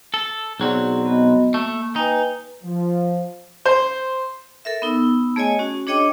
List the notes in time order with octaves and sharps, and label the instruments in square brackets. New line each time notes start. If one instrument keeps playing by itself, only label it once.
[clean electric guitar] A4
[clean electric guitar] B1 F#3 C4 [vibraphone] G#4 D5
[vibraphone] B3 F#4 D#5
[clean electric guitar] A3 [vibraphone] A#3
[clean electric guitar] D#4 [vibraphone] B4 G5 G#5
[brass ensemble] F3
[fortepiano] C5
[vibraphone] A4 A#4 E5
B3 D#4 E6
A3 G#4 C#5 D#5 G#5
C#4 F#4
D4 G#4 C#5 D#5 G5 D6